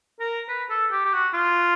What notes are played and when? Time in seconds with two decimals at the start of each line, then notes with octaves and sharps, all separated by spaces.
0.20 A#4
0.49 B4
0.70 A4
0.92 G4
1.05 G4
1.13 F#4
1.34 F4